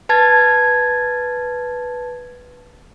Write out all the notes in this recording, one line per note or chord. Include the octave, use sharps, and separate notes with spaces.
B4 A5 G#6 A6